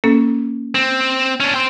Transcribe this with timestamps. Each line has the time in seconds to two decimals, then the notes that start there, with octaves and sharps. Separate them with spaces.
0.04 A#3 C#4 A4
0.75 C4
1.40 C#4 D4
1.54 C5 G5